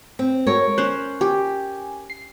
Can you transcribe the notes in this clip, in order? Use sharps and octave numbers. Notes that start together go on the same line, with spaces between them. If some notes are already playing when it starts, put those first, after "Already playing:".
C4
G#3 F#4 A4 A#4 C#5
C#4 C5 F#6
G4 G#5
C7